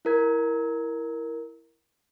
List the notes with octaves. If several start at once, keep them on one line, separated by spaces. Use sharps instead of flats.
E4 A#4 G#6